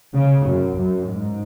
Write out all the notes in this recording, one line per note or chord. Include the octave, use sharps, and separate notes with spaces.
C#3
F#2
F#2
G#2